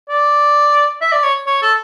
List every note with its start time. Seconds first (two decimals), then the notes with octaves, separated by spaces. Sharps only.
0.09 D5
1.01 E5
1.12 D5
1.23 C#5
1.46 C#5
1.62 A4